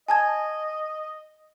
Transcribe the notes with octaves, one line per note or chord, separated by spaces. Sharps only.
D#5 G#5 A5 G#6